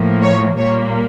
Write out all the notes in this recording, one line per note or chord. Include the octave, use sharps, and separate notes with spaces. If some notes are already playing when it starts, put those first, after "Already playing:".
Already playing: A2 F3 A#3
C#5
A#2 G3 A#3 C#5